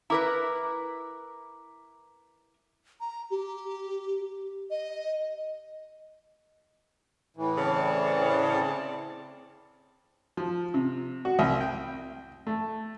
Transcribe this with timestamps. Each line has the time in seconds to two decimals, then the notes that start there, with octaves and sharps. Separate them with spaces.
0.10 E4 A#4 B4 A#5 D6
3.01 A#5
3.31 G4
4.71 D#5
7.37 A2 E3
7.57 C#3 C4 D5 A5
10.37 F3
10.74 C3
11.25 F#4
11.39 C2
11.61 G5
12.47 A3